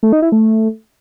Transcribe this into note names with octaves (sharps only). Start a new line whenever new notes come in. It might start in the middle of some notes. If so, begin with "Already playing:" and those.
A3
D#4
E4
A3